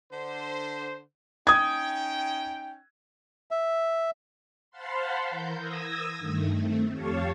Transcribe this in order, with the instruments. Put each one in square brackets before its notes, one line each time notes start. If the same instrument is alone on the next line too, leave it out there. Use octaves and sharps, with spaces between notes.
[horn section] D3 C5
[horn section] C#4 D#4 G5 [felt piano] D#6 G#6
[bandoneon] E5
[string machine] C5 F5 F#5 A5 B5 C6
E3 A#4 G6
D#6 E6 G#6 A#6
G2 D#3 A3
A3 C4
F2 G4 C#5 F5 A5 C#6